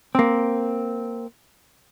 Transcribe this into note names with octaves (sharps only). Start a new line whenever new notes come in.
A#3 C4